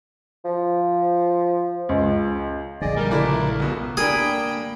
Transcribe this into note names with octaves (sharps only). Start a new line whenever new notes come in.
F3
C#2
A#1 D3 G#4 D5 D#5
G3 A#4
C#2 A3 D4 E4
C#2 B2
A#3 D4 G#4 G5 B5